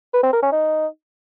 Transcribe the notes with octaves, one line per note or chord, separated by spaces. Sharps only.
B4
C4
A#4
C#4
D#4